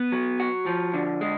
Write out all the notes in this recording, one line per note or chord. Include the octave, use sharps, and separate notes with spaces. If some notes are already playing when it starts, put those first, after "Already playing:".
Already playing: B3
F#3
F#4
F3
D3
G#3